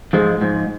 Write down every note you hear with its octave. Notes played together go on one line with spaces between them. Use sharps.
G#2 F3 G#3
G#2 F3